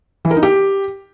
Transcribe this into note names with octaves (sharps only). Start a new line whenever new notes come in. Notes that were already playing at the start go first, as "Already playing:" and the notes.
E3
A#4
D#4
G4